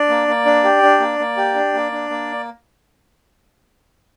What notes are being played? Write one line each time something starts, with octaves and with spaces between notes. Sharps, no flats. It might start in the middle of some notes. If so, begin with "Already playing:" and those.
Already playing: D4 D5
A#3
A#3
D4
G4
D4
A#3
A#3
G4
D4
A#3
D4
A#3